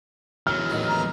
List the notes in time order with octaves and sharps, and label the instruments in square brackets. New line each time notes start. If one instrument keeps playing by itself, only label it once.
[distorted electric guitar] E2 F#3 [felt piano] F6
[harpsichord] A1 D#3
[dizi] A#5